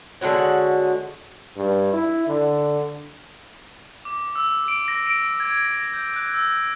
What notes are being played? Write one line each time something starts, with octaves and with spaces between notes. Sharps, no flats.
D3 G#3 F#4 C#5
G2
E4
D3
D6
E6
D7
A#6
D7
G#6
A#6
G6
F#6
E6